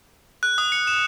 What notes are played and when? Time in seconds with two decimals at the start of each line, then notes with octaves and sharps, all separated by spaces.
0.43 F#6
0.58 D#6
0.72 C#7
0.87 E7